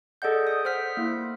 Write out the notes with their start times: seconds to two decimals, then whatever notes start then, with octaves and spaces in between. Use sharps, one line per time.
0.22 G#4 A4 D5 D#5 F#5 G6
0.47 D#6
0.65 C5 F#5 F6 B6
0.97 A#3 E4